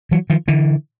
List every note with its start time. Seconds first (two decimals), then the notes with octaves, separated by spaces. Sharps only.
0.11 E3 F#3
0.30 D#3 F3
0.48 D3 E3